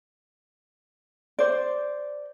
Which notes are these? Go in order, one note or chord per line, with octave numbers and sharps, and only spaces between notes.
C5 D5